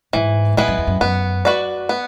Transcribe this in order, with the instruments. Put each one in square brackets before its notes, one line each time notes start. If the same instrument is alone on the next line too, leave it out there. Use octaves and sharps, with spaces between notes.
[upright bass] G#2 [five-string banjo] E3
[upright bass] G#2 [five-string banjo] G#3 B3 E4 B4
[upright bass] F#2
E2
F#2
[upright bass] F#2 [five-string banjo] B3
[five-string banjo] F#4 B4 D5
B3